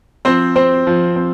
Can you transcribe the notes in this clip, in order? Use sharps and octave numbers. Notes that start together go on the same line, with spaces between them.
F3 C4 C5
C4 C5
F3
C4